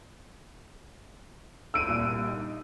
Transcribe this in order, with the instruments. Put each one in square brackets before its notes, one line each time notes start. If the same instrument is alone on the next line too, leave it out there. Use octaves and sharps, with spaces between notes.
[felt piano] D2 D4 E4 [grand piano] E6 D7 D#7
[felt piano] C2 A#2 G3
D#4